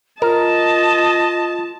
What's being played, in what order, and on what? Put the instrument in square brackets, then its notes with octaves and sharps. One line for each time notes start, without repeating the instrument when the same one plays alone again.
[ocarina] F4 [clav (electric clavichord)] A#4 [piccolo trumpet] D#5 [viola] A5